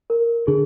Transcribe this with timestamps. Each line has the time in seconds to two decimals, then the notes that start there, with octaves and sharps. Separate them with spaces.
0.10 A#4
0.47 D3 G#4